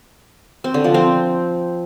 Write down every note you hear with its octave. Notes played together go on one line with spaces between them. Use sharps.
C4
D3
F3
C4